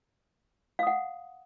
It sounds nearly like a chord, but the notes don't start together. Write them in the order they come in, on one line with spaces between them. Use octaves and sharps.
F5 D#6 F#5